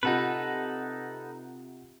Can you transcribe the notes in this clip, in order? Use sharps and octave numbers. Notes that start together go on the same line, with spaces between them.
C3 D#4 F4 A4 B4 F#5